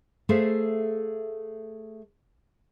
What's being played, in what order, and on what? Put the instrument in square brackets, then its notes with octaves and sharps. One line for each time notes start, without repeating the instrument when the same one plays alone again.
[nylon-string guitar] A3 G#4 A4 C5 E5 F5